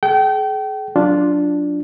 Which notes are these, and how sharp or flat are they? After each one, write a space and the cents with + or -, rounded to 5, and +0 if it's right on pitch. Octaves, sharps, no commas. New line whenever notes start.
G#4 +40 G5 -30
F#3 -5 D4 +0 F4 +0